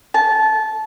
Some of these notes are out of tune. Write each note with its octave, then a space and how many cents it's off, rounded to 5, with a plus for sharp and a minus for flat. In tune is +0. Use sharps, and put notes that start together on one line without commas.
A5 -20